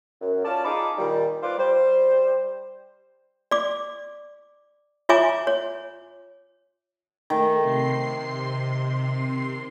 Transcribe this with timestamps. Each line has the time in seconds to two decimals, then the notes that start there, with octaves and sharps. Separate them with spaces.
0.21 F#2
0.44 C#4 F4 D5 A5
0.65 D#4 F4 G#4 A#5 B5 D6
0.99 A#2 D#3 G3
1.42 F4 B4 C5 D5 D6
1.58 G3 C5
3.51 D5 D6
5.09 F4 C#5 E5 G#5 A#5 D6
5.47 C#5
7.30 D#3 A3
7.63 C3 C6 C7